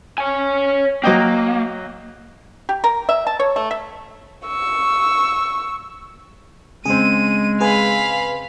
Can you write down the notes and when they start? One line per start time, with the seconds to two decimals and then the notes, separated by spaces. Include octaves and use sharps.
0.18 C#5 G#5
1.04 F#3 A#3 D#5 G5
2.69 G4
2.84 A#4
3.09 E5
3.27 A5
3.39 C#5
3.56 A3
3.71 E5
4.46 C#6 E6
6.85 C#3 G#3 C4 G#4 D#7
7.61 G#4 B4 F5 G#5 B5